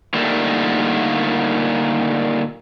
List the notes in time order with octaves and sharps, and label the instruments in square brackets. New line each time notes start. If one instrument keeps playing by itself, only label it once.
[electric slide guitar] A#2 D3 D#3 G3 A3 A#3